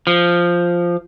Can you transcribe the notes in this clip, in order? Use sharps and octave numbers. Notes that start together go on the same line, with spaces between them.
F3